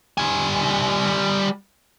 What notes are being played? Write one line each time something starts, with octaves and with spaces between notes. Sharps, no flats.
G3 G#5